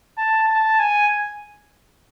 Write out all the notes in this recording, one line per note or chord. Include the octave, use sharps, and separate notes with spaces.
A5
A5
G#5